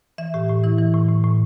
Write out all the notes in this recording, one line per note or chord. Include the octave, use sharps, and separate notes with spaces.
E3 E5
A2 G4
A2 G4
E3 E4
E3
A2
A2
A2